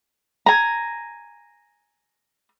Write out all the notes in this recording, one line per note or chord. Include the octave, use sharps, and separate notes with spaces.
G#5 A#5